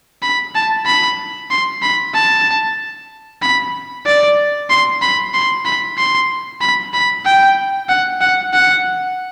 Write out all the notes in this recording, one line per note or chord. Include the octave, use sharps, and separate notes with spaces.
B5
A5
B5
C6
B5
A5
B5
D5
C6
B5
C6
B5
C6
B5
B5
G5
F#5
F#5
F#5